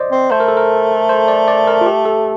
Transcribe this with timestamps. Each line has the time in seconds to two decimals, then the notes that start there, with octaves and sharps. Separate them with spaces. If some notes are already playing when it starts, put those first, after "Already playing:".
Already playing: C5 D5 D#5
0.12 C4
0.31 A3 C5
0.40 A#4
0.48 A4
0.57 A#4
1.09 C5
1.28 D5
1.48 D5
1.67 A#4
1.81 F4
1.86 G4
2.05 A4